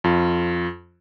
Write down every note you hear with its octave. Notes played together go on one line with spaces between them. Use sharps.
F2 F4